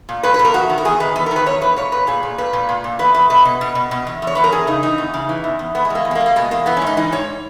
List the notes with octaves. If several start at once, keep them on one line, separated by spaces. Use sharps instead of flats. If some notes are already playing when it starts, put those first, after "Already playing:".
A#2
A#2 B4
B4
A#2
A#4
E2 F#4
D#3
A#4
E2 G#4
D#3 B4
E2 B4
A#4
D#3
B4
E2 C#5
E2 B4
A#2 C#5
A#2 B4
A#2 G#4
A#2
A#2 B4
A#2
A#2
A#2
E2 B4
E2 B4
B2 B4
B2
B2
B2
B2
E2
E2
C#5
E2 B4
A#4
E2 G#4
C#3 D#4
E3 D#4
E2
C#3
E3
E2
E2
E2 B3
G#3
E2 A#3
E2
G#3
A#3
B2
A#3
B2 G#3
E2 A#3
E3 B3
C#4
G#2 D#4
E3 D#4
G#2 C#5